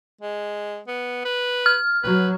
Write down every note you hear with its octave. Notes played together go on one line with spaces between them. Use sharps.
G#3
B3
B4
F6
F#3 B4